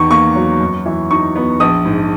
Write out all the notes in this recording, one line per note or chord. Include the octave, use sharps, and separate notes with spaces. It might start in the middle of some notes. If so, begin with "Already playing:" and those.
Already playing: E2 D#3 C#6
A#3 C#6
F#3
F#2
E3
D#4 C#6
B3
A#1 D#6
G#2